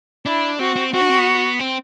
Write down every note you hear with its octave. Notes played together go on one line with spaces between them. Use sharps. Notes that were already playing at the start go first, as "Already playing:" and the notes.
D4 E4
C4 F#4
C4
C4 F#4
D4
C4
B3
C4